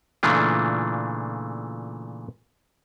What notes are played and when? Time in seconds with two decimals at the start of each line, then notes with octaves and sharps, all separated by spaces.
0.23 A#2 C#3 E3 A3 D4 F4